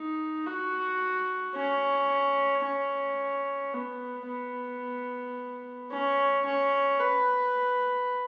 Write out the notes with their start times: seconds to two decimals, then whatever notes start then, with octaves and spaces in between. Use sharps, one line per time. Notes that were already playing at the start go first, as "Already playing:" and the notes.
Already playing: D#4
0.47 F#4
1.56 C#4
2.64 C#4
3.74 B3
4.28 B3
5.91 C#4
6.46 C#4
6.99 B4